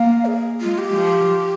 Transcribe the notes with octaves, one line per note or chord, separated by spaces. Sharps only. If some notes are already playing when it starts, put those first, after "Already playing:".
Already playing: A#3 F5
G#4
G#3 F4
G4
F3